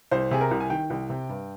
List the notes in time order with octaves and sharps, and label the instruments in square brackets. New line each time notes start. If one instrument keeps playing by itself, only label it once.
[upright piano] C2 C5
C3 G#4
A#4
C2
G#5
D#3 G5
C2
C3
G2